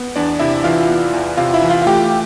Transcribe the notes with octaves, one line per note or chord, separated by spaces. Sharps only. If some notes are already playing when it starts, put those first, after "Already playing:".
Already playing: B3
E2 D4 D5
C3 E4 E5
E3 F4 F5
B3
E2
C3 F4 F5
E4 E5
E3
F4 F5
F5
A3 G4 G5